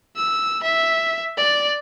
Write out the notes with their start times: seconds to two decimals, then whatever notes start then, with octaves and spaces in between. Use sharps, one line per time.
0.16 E6
0.63 E5
1.37 D5